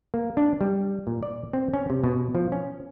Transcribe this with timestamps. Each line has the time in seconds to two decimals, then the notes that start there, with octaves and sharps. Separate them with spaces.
0.14 A#3
0.37 D4
0.61 G3
1.07 A#2
1.23 D5
1.53 C4
1.74 C#4
1.90 C3
2.04 B2
2.35 F3
2.52 C#4